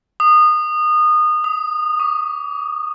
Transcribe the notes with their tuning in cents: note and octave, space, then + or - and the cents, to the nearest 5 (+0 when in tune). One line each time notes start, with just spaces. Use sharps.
D#6 -25
D#6 +15
D6 -35